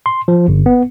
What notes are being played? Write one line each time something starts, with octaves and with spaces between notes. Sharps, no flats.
C6
F3
G1
B3